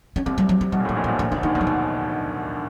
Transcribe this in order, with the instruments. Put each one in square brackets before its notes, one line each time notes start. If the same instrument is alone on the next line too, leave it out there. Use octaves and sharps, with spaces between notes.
[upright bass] C#4
[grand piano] C2 C3 [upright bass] C4
[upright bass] G3
F#3
G3
[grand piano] B1 B2 [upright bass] G3
[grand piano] A#2
A2
[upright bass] G#3
[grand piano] A#1 A#2
[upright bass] A3
[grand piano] B1 B2
[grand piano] A#1 A#2 [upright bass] A#3
[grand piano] D2 D3 [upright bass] B3
[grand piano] D#2 D#3 [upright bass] A#3
[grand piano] B1 B2 [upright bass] A3
[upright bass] G3
G#3